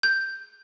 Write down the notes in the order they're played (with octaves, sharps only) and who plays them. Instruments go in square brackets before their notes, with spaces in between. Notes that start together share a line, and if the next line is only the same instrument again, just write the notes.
[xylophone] G6